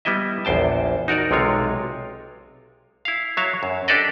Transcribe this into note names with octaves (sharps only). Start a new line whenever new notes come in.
G3 B3 E4 D#5 E5
A#1 E2 C5 G5 A5
D#4 F#4 A#4 D5
B1 C3 G#3 F4 C#5
E4 F5
F#3 C#5 E5 F5
F#2
D4 G4 A4 B4 D5 D#5